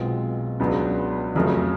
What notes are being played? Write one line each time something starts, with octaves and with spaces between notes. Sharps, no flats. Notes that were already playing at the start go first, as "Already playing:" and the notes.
Already playing: B1 B2 G#3 C4 F4
C#2 C#3 F#3 B3 D4
F1 F2 C#3 F#3 A3